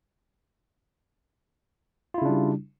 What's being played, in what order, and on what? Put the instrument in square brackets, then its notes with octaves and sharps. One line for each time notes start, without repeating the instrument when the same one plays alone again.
[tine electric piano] F4
E4
C#3
D4
G3